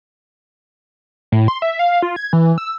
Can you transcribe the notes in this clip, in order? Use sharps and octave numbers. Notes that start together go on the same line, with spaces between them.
A2
C6
E5
F5
F4
G#6
E3
E6